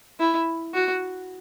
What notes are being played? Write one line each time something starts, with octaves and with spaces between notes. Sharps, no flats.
E4
F#4